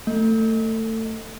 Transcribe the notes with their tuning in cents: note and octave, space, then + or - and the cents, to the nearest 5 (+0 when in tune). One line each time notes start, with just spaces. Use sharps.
A3 +25